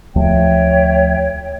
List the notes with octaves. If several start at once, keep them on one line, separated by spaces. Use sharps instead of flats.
D2 F3 A3 C#5 E5 G5